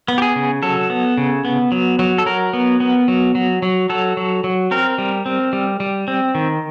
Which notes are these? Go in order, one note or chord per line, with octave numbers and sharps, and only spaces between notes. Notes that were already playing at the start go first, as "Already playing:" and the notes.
B3
G4
G#4
C#3
F#3 A4
B3
C#3
B3
F#3
F#3
A4
F#3 A#4
B3
B3
F#3
F#3
F#3
F#3 A4
F#3
F#3
C4 A#4
G3
C4
G3
G3
C4
D#3